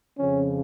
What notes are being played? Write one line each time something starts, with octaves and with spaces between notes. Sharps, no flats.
F2 C#3 F3 C#4